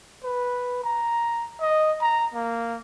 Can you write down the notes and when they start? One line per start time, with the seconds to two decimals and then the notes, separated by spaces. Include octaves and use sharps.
0.24 B4
0.84 A#5
1.61 D#5
2.02 A#5
2.34 A#3